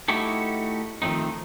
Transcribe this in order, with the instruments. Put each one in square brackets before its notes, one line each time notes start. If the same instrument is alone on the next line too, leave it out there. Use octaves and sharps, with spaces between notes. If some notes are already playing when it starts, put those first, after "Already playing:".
[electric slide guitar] A3 D#4 E4 F#4 G4 A4
D#3 F3 A3 C4 D#4